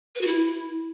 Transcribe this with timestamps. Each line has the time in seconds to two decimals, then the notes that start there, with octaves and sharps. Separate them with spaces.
0.15 B4
0.21 F#4
0.27 E4